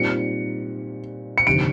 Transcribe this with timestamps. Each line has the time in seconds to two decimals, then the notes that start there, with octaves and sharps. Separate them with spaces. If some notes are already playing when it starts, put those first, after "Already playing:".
Already playing: A#2 G3 C4 D#4 C#7
1.38 C#7
1.47 G1 F2 C3 D#3 D7